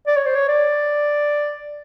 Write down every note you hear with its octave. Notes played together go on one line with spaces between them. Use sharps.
D5
C#5
C5
C#5
D5